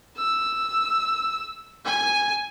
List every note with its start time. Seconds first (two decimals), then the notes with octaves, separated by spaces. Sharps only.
0.17 E6
1.85 G#5